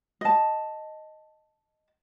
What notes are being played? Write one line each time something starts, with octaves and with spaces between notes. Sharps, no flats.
D#5 A5